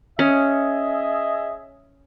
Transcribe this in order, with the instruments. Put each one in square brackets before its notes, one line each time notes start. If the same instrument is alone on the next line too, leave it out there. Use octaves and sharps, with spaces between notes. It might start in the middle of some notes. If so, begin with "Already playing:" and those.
[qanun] C#4 [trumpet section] G#4 D#5 E5